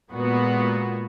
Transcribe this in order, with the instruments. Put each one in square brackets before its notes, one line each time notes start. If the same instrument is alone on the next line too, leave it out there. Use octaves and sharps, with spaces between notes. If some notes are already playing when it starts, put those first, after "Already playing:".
[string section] A#2 G#3 B3 F#4